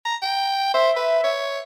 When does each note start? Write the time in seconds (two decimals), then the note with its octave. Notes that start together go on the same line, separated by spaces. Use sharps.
0.05 A#5
0.22 G5
0.74 C5 E5
0.97 B4
1.24 C#5